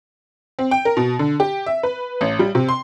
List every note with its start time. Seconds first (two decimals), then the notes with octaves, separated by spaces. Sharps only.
0.59 C4
0.71 G5
0.85 A#4
0.97 B2
1.19 D3
1.40 G4
1.66 E5
1.83 B4
2.21 A1
2.39 G3
2.55 C3
2.69 C6